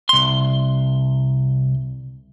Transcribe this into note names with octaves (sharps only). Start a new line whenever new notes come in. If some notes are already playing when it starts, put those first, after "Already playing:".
C2 C6